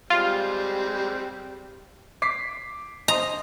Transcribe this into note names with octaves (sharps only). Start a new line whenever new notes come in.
G3 G#3 C4 F4
D6 B6 C7
D#5 A#5 C6 D#6